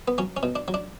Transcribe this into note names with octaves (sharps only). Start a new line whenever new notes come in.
B3
F#3 C#4
C#4
B2
D4
F#3
D4